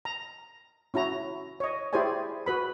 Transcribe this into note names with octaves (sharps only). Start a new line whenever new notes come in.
A#5
C#4 E4 F#4 A#5
C#5 D#5
E4 G4 G#4 C5 D5 G#5
F#4 B4 B5